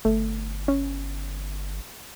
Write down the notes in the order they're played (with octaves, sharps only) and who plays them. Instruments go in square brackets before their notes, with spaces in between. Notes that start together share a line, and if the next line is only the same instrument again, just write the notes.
[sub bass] G1 [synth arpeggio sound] A3
[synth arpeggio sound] C#4